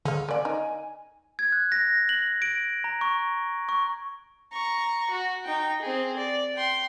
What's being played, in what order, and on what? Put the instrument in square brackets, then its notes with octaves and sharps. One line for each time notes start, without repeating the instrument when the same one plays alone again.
[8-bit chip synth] D3 [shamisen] G#4 F5
[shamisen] A#3 D5 [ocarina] G#5
[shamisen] D#4
[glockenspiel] G#6
F#6
A#6
F#7
D7
A#5
C#6
C#6
[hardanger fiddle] A#5 C#6
F#4
D#4 G5
C4 G#4
D5
G5 C6